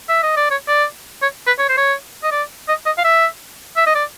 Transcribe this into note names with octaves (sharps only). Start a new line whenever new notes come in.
E5
D#5
D5
C#5
D5
C#5
B4
C#5
C5
C#5
D#5
D5
D#5
D#5
F5
E5
E5
D#5
D5